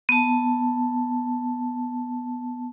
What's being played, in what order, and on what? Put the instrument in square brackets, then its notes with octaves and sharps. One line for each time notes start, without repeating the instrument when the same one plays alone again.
[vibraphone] B3 A5